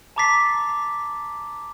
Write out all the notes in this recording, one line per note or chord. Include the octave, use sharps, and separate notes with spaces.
A5 A#5 D6 A6 B6 C7